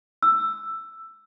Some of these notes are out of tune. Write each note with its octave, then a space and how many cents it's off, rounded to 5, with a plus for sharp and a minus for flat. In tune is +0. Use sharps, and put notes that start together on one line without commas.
E6 +10